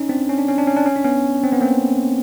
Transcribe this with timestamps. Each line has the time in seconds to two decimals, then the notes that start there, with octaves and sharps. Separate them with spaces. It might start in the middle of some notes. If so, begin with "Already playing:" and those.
Already playing: C#4 D#4
0.09 C4 D4
0.29 C#4
0.38 D4
0.48 C#4
0.58 D4
0.67 C#4
0.77 D4
0.86 C#4
0.96 D4
1.04 B3 C#4
1.44 C4
1.52 B3
1.61 A#3 C4